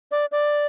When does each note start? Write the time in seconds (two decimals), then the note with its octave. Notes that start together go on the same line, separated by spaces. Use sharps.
0.11 D5
0.32 D5